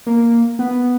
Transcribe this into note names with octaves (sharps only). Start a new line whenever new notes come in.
A#3
B3